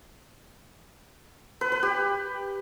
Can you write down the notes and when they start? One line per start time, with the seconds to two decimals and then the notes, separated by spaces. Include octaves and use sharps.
1.61 B4
1.72 B4
1.83 G4